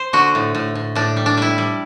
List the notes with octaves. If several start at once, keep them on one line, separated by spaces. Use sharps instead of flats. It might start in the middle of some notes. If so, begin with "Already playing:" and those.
Already playing: C5
D3 F#4
A2
A2
A2
A2 D4
G3
D4
G3 E4
G3